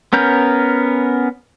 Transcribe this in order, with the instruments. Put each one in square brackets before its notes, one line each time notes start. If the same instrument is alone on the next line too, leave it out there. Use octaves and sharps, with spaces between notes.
[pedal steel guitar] B3 C#4 A#4 G6